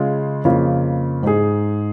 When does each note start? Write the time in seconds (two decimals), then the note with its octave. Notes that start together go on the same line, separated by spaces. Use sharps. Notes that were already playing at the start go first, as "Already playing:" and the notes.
Already playing: C#3 G#3 F4
0.45 F2 C#3 A#3 F4
1.23 G#2 G#3 D#4 G#4